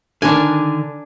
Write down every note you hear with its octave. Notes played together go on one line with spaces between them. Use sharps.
D3 D#3 D4 G#5